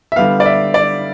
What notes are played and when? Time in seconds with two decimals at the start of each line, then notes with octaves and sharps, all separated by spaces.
0.12 E5
0.16 D3 G3 B3 F5
0.40 D5
0.46 E5
0.74 D5